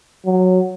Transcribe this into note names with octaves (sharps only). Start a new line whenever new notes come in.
F#3